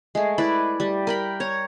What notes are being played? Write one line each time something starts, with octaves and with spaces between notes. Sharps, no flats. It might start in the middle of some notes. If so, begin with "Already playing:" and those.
G#3 A3
E4 B4 D5
G3
A#4 G5 B5
C#5 A#5